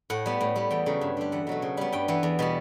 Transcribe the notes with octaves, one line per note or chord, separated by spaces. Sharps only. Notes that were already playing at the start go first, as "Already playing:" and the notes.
A2 F#5
G3 B3
A2
G3 B3
E2 G5
C#3 F#3 A3
G2
D3 G3
E2 F#5
B2 F#3 A3
C#3
G3 B3
G2 G5
E3 B3 F#5
E2
B2 G3 B3